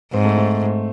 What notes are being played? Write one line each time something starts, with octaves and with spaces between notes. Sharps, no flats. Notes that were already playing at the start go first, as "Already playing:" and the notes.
G#2 C4
A3
A3